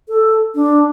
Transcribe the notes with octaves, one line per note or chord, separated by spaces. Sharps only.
A4
D4